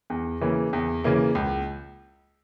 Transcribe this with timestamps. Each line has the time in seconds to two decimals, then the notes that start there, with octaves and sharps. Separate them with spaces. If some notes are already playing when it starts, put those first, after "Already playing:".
0.10 E2
0.41 C#3 E3 A#3
0.73 E2
1.04 C#3 E3 A#3
1.35 C#2